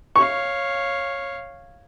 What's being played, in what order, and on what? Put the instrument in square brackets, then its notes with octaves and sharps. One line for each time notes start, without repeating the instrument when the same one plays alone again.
[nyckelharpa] C#5 F5 [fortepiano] C#6